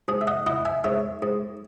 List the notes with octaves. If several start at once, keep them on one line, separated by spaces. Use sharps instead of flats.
G#2 G#4
E5
D#5 F#5
E4 D#5 F#5
E5 G#5
G#2 C#5 E5
G#2